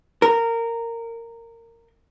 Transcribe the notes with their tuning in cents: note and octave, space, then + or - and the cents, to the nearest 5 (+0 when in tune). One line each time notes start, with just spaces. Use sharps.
A#4 -15